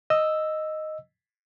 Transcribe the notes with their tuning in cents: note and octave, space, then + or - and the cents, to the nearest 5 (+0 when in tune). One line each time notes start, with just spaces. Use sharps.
D#5 +0 E6 +0